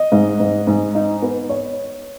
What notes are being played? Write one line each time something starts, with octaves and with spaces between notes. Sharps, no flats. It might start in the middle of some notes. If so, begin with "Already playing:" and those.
Already playing: D#5
G#2
G#2
G#2
D#4
B3
C#5